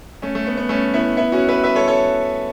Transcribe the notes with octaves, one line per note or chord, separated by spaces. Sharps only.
A3 C#4
A3
B3
B3
A3 C#4
B3 E4
B3 E4
C#4 F#4
B4 E5
B4 E5
A4 C#5
A4 C#5